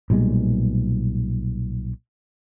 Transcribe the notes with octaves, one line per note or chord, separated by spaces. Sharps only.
B1 A#2 G3 G#3